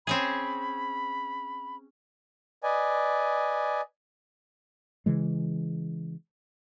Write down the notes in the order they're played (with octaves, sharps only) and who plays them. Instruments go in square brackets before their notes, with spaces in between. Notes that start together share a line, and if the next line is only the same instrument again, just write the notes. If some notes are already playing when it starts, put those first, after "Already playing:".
[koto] C4 C#4 G#4 [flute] B5
[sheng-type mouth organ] B4 D5 D#5 G#5
[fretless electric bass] C#3 E3 G#3